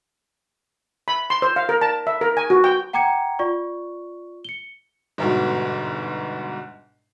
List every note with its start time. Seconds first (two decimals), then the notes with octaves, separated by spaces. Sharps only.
1.08 B5
1.30 C6
1.42 C5
1.56 F5
1.69 A#4
1.81 A5
2.07 E5
2.21 A#4
2.37 G#5
2.50 F#4
2.64 G5
2.93 F#5 G5 A#5 D6 G#6 C#7
3.39 F4 D5 C#6
4.45 C#7 G7
5.18 G1 G#2 B2